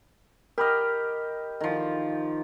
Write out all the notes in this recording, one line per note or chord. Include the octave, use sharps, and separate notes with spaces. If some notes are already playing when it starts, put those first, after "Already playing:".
G4 A#4 D#5 B5 F6
D#3 F3